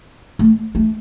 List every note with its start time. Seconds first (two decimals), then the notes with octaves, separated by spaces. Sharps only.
0.39 A3
0.75 A3